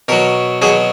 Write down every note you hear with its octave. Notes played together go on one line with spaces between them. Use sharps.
B2 F#3 A#4
B2 F#3 G#4